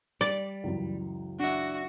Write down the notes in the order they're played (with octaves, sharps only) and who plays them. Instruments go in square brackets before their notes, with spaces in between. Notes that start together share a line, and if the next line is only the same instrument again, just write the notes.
[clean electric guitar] G3 [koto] D5
[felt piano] C#2 F#2 E3
[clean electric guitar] D4 E5 [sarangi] F#4